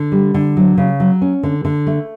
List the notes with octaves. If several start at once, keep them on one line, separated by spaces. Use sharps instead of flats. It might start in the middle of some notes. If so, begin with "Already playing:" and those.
Already playing: D3
G3
D3
F#3
C#3
F#3
C#4
D3
D3
A3